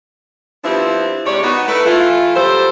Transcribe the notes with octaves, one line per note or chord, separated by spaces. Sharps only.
F3 G3 B3 C4 D4 E4
C3 G3 G#3 C#5 D5
B3 D#4 F#4
A3 E4 B4
E3 A3 F4
F#3 G3 A4 C5